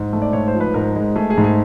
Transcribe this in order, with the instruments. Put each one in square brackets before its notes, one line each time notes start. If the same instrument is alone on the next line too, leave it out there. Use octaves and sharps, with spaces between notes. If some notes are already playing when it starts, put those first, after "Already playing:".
Already playing: [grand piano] G#2
A3
D5
G#2 C#5
C5
F3
B4
G#2 A#4
G#3
A3 G#4
G#4
G#2
G#4